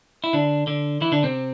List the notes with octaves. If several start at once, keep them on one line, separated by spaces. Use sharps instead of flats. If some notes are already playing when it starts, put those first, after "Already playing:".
E4
D3 D4
D3 D4
E3 E4
D3 D4
C3 C4